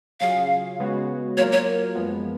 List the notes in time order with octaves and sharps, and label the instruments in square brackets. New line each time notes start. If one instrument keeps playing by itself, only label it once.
[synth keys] C#3 F#3 C#4 F4 G#4 [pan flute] F5
[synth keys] C#3 G#3 B3 F#4 C#5
[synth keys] F#3 A#3 F4 A#4 [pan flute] C#5
[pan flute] C#5
[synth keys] F#2 F3 G#3 B3